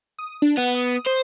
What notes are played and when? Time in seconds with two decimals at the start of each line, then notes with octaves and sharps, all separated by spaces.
0.19 D#6
0.42 D4
0.57 B3 F#5
0.75 D#6
1.06 C5